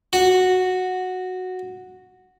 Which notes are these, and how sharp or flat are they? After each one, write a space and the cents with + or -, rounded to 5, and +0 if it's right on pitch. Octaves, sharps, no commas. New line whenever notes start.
F#4 -5